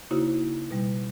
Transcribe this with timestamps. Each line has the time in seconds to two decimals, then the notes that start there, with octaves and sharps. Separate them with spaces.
0.11 C#3 A#3 D#4 E4 F#4 C5
0.71 B2 G3